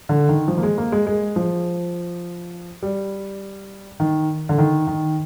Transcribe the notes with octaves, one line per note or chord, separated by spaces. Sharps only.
D3
D#3
F3
A#3
G#3
A#3
G#3
G#3
F3
G3
D#3
D3
D#3
D#3